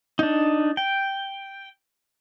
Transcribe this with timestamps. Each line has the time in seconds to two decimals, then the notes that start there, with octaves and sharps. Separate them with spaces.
0.19 D4 D#4
0.77 G5